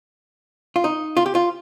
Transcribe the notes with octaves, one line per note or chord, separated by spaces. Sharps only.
F4
D#4
F4
G4
F4